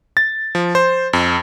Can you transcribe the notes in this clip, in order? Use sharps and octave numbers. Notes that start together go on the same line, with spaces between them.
A6
F3
C5
F2